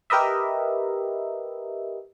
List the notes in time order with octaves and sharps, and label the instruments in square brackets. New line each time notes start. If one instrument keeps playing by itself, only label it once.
[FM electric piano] G4 A#4 B4 D#5 E5